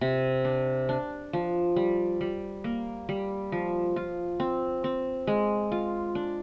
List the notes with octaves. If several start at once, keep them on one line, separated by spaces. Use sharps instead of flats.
C3
D4
D4
F3
G3
G3
A#3
G3
F3
F4
C4
C4
G#3
F4
D4